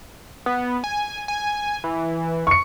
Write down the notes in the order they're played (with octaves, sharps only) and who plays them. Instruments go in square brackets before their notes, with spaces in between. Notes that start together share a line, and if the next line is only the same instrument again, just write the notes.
[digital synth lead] B3
G#5
G#5
E3
[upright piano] C#6 C#7